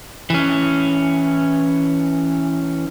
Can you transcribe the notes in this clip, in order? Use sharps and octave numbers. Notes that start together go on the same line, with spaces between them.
E3 C#4